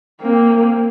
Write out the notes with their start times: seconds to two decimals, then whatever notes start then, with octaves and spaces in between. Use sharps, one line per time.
0.22 A#3 C4